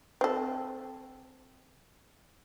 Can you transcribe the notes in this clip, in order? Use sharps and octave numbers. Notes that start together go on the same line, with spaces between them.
C4 A4